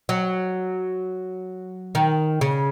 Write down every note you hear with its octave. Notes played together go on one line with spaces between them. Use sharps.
F#3
D#3
C#3